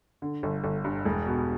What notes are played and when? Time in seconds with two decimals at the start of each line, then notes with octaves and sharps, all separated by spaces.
0.22 D3
0.43 G1
0.64 G1
0.84 G2
1.05 E1
1.26 B2